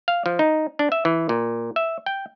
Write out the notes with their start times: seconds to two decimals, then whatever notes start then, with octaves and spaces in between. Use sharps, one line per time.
0.08 F5
0.26 F3
0.39 D#4
0.79 D4
0.92 E5
1.05 E3
1.29 A#2
1.76 E5
2.06 G5